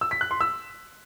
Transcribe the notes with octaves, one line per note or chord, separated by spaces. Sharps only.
E6
B6
F#6
C6
E6